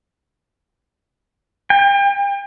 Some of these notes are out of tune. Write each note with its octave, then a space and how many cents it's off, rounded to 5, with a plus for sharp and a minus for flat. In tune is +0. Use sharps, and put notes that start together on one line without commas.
G5 +35